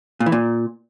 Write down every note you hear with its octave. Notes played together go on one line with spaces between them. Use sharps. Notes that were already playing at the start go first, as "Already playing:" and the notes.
A#2
E3
A#2